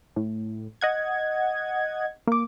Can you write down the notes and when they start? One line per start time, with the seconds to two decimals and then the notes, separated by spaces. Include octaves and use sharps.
0.16 A2
0.81 D#5 F#5 G#6
2.27 A#3 D6